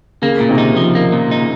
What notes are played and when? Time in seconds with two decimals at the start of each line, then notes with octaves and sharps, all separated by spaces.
0.22 C#3 A#3
0.40 A#2
0.49 C3 D#3
0.58 D#4
0.77 F3
0.95 A#3
1.12 A#2
1.31 D#4